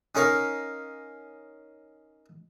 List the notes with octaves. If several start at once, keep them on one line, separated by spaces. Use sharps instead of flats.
C#4 D#4 A#4 C#5 F5